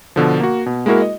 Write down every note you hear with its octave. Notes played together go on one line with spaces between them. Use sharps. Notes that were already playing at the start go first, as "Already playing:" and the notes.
B2 D3 F3
A#3 F#4
B2
G#3 A#3 E4 F#4 A#4
D#5